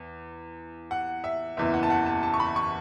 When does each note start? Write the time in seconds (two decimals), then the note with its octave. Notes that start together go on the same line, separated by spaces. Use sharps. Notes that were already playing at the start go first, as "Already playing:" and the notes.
Already playing: E2
0.91 F#5
1.24 E5
1.57 F#1 E2 E3 E5
1.74 F#5
1.83 A5
1.90 F#5
2.06 A5
2.23 A5
2.34 C#6
2.40 B5
2.56 C#6